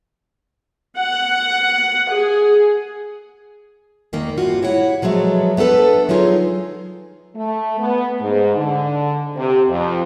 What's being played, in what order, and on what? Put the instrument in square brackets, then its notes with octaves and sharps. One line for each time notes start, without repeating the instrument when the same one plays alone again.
[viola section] F#5
G#4
[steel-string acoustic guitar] E2 D#3 A#3
G2 C3 F4 F#4
E4 C#5 F#5
F3 F#3 G#3 A3 B3
A3 B3 D4 A4 B4
F#3 G#3 D#4 F4 G#4
[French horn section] A3
B3
G#2
D3
C3
F2